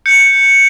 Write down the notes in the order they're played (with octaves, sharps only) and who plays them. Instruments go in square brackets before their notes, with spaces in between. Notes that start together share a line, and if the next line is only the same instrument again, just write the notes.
[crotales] G6 C#7